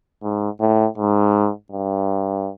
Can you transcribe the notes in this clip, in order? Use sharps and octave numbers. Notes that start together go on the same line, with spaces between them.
G#2
A2
G#2
G2